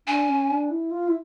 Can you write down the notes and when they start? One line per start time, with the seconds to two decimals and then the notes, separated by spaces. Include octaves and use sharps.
0.07 D4 G#5
0.29 C#4
0.50 D4
0.71 E4
0.91 F4
1.08 E4